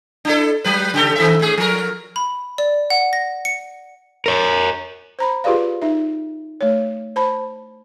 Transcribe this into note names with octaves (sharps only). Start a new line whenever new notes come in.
D4 E4 A4
F#3 B4
C#3 G4 A4
D#3 E3 E5
A2 A3 G#4
F3 A#4
B5
D5
F#5
A#6
C#7
A#4 C#5
C5 A#5 B5
F4 G4 G#4 B4 D5 F5
D#4 E5
A3 C#5
C5 A5 B5